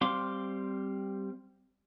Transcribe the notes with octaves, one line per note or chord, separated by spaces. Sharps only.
G3 C4 F5 C6 D6